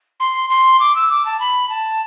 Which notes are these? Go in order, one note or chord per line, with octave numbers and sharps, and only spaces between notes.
C6
C6
D6
E6
D6
A5
B5
A5